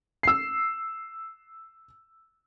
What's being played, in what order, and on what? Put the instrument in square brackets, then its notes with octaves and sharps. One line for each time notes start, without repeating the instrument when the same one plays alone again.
[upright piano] E6 C7